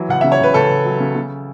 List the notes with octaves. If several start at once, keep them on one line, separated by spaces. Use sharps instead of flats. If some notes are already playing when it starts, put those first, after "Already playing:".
Already playing: E3 F#3
C#2 F#5
C#3 E5
C#5
C#2 B4
C#2 A4
C#2
F#3
C#3
C#3